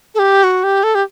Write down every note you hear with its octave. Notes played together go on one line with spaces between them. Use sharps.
A4
G4
F#4
G4
A4
G4